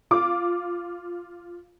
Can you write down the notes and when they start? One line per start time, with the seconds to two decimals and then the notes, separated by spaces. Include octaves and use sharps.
0.11 F4 D6